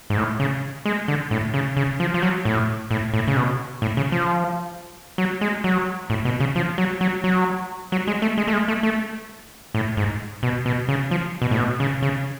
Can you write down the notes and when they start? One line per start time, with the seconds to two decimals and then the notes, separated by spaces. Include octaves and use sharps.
0.10 G#2
0.17 A2
0.40 C#3
0.86 G#3
1.08 D3
1.31 A2
1.54 C#3
1.77 C#3
2.00 F3
2.14 F3
2.22 F#3
2.45 A2
2.91 A2
3.14 A2
3.28 C#3
3.37 B2
3.82 A2
3.97 C#3
4.12 F3
5.18 F#3
5.41 G#3
5.64 F#3
6.10 A2
6.25 B2
6.40 C#3
6.56 F3
6.78 F#3
7.01 F#3
7.24 F#3
7.92 F#3
8.07 G#3
8.22 A3
8.38 G#3
8.48 A3
8.53 G#3
8.68 A3
8.83 A3
9.75 A2
9.97 G#2
10.43 B2
10.66 B2
10.89 C#3
11.11 F3
11.42 B2
11.51 A2
11.57 B2
11.80 C#3
12.02 C#3